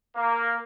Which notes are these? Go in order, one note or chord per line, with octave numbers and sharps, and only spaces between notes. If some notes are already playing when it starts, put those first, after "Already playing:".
A#3